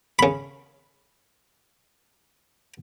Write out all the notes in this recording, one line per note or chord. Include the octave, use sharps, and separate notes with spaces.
C#3 B5